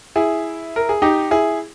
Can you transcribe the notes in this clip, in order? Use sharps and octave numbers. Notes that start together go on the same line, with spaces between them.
E4 G#4
A#4
G#4
D#4 G4
E4 G#4